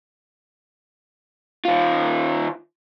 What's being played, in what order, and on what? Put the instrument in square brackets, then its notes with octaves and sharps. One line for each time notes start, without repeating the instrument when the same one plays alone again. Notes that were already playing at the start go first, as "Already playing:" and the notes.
[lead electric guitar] D#3 F4